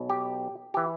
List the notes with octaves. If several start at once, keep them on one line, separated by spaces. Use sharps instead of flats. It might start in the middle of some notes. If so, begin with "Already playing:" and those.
Already playing: B1 B2
G4
E3 G4